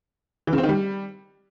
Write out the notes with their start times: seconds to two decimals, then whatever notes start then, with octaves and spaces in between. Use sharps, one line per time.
0.47 E3
0.53 C#3
0.58 C4
0.63 D#3
0.69 G3